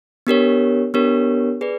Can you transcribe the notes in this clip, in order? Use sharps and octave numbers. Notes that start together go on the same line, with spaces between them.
B3 D4 G4 A#4 C#5
B3 D4 G4 A#4 C#5
G#4 B4 D5